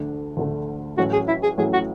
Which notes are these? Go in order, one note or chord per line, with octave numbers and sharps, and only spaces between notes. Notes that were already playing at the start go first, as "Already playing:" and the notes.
Already playing: D2 D3 A3 D4
D2 D3 A3 D4
A1 A2 F#3 C#4 F#4
G#4
E4
G#4
A1 A2 F#3 C#4 G#4
F#4